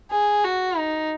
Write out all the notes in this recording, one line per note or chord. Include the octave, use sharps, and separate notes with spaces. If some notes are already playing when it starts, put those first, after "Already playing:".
G#4
F#4
D#4